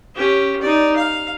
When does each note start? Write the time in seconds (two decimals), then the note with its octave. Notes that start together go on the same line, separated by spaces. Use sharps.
0.15 C#4 G4
0.62 D#4 D5
0.96 F5